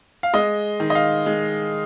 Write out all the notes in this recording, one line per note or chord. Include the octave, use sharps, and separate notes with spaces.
F5
G#3 D#5
D#3
D#5
F5
G#3